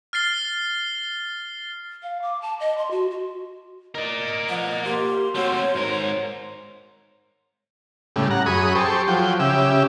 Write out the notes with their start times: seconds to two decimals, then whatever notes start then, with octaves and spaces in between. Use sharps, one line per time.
0.13 F6 A6 C7 G7
2.03 F5
2.22 D6
2.42 A5
2.60 D#5
2.78 C6
2.91 F#4
3.11 F#4
3.95 A#4 D5 D#5
4.49 F3 F#5
4.85 A#3 G4 C6
5.35 A3 C4 F#4 C#5
5.75 G#2 A#4 C5
8.16 A2 C#3 G3
8.30 F#5 A#5
8.46 F#2 G#4 B5 C#6 D#6
8.75 G4 A4 C5 C#6
9.08 F3 F#3 G5
9.39 C#3 G4 E5